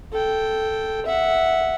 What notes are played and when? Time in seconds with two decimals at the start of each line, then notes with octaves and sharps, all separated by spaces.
0.13 A4 G5
1.06 E5 F#5